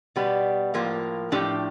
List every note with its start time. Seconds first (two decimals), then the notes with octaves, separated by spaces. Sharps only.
0.16 B2 G3 B3
0.74 A2 F3 A#3
1.32 A2 F3 A3 D4 G4